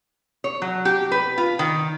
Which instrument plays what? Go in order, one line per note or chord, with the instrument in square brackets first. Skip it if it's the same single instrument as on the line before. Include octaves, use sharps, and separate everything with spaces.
[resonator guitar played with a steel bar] C#5
F#3
G4
B4
F4
D#3